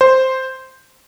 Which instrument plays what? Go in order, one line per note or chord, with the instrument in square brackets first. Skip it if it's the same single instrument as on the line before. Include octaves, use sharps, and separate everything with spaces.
[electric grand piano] C5